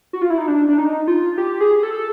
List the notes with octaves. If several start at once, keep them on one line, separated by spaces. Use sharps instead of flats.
F#4
F4
E4
D#4
D4
D4
D#4
F4
G4
G#4
A4